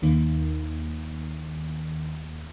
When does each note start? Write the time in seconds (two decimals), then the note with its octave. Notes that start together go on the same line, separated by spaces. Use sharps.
0.02 D#2 D#3 A#3